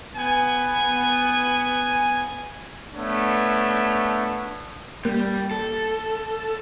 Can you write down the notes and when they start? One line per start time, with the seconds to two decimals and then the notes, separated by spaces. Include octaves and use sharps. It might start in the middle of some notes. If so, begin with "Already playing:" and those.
0.17 B3 G#5
2.94 A3 B3 D4 C#5
5.05 G3 A#3
5.51 A4